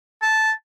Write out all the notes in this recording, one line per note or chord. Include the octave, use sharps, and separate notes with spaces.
A5